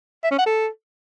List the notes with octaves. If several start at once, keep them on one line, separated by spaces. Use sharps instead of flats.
E5
C#4
F#5
A4